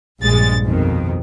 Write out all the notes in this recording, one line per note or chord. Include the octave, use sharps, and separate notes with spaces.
A#1 G2 G#3 A6
F2 B2 D#3